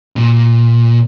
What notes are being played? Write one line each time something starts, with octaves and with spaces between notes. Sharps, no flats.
A#2